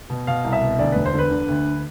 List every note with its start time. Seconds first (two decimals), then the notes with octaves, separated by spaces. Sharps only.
0.10 B2
0.27 B2 F5
0.44 C2
0.52 E5
0.61 B2
0.79 D2 D5
0.92 E1 B4
1.06 C5
1.14 D3 B4
1.31 D3
1.48 D2